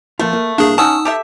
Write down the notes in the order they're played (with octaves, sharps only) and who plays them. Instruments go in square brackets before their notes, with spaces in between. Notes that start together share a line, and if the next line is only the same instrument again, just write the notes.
[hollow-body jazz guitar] F3 A#3 F4 [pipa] A3
[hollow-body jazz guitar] A#3
[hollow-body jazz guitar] C2 A#3 F5 [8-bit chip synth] D4 G#4
[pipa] C#4 [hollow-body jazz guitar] D#4 F#5 [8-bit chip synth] A5 D#6 E6
[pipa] G4 A4 E5